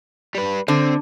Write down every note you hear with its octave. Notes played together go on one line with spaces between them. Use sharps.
G3 B4
D3 C4